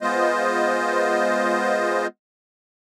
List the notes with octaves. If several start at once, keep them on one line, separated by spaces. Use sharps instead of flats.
G#3 B3 F4 C5 D#5